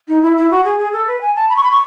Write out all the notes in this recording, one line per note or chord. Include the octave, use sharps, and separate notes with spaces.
D#4
E4
E4
F#4
G#4
G#4
A4
B4
G#5
A5
B5
C#6
B5
C#6